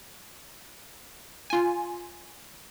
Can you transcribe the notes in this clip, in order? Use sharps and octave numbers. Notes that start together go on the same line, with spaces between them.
F4 G#5